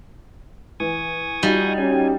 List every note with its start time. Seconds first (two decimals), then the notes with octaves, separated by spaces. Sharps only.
0.80 E3 G#5 C#6 D#6
1.43 G3 D#4 F4 F#4
1.78 C#4 G4 G#5